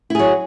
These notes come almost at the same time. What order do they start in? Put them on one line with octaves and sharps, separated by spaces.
E4 G#4 F#3